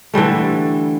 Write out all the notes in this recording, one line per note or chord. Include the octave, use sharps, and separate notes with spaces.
D3 E3 G3 A3